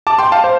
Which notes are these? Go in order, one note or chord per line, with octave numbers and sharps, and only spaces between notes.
A5 D6
G5 C6
F5 A5
C5